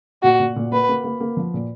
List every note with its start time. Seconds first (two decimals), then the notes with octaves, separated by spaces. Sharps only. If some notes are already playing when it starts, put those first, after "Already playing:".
0.23 A#2 F#4
0.40 A#2
0.56 A#2
0.71 A#3 B4
0.89 A#3
1.04 A#3
1.20 A#3
1.37 F3
1.54 A#2